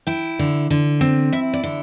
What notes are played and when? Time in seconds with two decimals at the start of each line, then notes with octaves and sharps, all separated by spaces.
0.07 E4 G5
0.39 D3
0.70 D3
1.01 C4
1.33 E4 E5
1.53 D5
1.64 D3